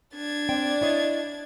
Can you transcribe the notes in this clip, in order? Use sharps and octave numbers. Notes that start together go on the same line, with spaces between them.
D4 G#6 A6
C4 D5 G5
E4 C#5 D#5